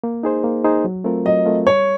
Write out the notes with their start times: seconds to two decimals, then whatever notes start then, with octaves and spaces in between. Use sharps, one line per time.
0.04 A#3
0.23 D#4 G#4 C5
0.44 A#3
0.65 D#4 G#4 C5
0.85 F#3
1.04 A3 C4 F4 A#4
1.26 F#3 D#5
1.46 A3 C4 F4 A#4
1.65 G3 C#5